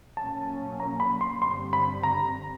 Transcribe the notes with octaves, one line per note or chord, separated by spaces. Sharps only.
A#2 F#3 A#3 C#4 A5
A#5
B5
C6
G2 D3 G3 C4 C6
B5
A#5